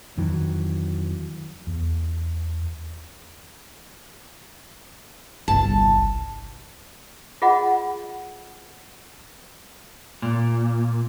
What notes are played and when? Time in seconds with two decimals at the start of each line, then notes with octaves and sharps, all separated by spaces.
0.17 F2 D#3 E3 F#3
1.67 E2
5.48 G1 C2 A5
7.42 F4 G#4 D#5 F#5 B5
10.22 A#2